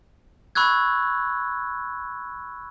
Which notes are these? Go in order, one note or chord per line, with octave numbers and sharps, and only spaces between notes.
B5 C#6 E6 F#6 G#6